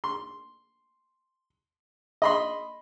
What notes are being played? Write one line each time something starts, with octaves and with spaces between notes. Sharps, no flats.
C6
D#5 B5 C6